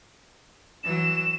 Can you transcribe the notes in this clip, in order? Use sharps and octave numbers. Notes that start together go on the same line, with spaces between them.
E3 F#3 E7